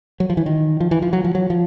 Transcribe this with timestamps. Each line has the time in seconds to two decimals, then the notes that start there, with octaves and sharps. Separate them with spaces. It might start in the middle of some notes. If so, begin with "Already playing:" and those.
0.20 F#3
0.30 F3
0.37 E3
0.46 D#3
0.80 F3
0.91 E3
1.02 F3
1.13 F#3
1.24 F3
1.35 F#3
1.50 F3